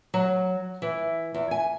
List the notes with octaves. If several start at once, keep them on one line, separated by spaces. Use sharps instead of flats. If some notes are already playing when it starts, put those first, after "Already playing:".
F#3
E3
E2
G#5